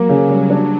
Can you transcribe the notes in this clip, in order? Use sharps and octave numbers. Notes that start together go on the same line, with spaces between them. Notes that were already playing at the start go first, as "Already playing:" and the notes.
Already playing: F#3 A#3
C#3
G3
D4